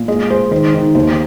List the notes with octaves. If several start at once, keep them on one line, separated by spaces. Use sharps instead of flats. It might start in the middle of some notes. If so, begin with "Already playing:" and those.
Already playing: A#2
G#3 D#5
G#3 C5
D#3 C5
D#3
D#2 C5